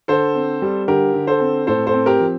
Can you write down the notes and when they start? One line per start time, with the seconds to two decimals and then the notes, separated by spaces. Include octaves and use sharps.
0.08 D3 A4 C5
0.35 C4
0.62 G3
0.88 D3 G4 A#4
1.14 D3
1.27 A4 C5
1.40 C4
1.67 A2 A4 C5
1.87 A4 C5
1.94 C4
2.06 G4 A#4
2.20 F3